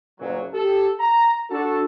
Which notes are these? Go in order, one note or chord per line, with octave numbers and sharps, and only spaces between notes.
F#1 A#2 F#3
G4 A4
A#5
D4 F#4 A4 A5